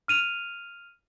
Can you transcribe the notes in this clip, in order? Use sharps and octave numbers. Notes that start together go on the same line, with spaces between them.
F6 D#7 F7